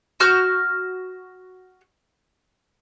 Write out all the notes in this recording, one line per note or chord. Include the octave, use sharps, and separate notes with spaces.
F#4 F6 G6